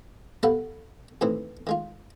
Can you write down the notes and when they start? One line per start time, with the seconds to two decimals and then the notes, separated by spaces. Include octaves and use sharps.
0.43 G3 B3 A4 B4 F5 F#5
1.21 D#2 A2 E3 C4 D#4
1.67 D#3 G#3 F4